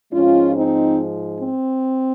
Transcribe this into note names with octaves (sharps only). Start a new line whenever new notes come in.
G#2 F3 G#3 C#4 F4
C4 D#4
C4